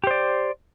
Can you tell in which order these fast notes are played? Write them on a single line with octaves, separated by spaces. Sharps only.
G4 C5 D5